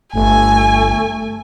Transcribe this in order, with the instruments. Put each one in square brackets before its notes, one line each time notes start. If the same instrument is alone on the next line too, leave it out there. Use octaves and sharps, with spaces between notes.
[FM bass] G1 [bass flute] A3 [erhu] G#5